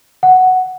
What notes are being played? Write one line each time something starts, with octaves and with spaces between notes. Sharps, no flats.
F#5